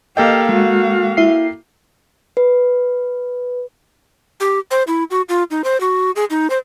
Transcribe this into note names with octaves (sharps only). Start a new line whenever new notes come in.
A#3 G4 A4 D#5 F5 G5
G#3 F#4 F5
E4 E5 C7
B4
G4
C5
E4
F#4
F4
D#4
C5
F#4
G#4
D#4
C5